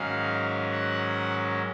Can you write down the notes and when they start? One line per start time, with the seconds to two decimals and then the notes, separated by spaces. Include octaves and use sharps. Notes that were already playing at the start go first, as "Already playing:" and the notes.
Already playing: G#2 D#3 F#3 C#4 F5
0.72 F#5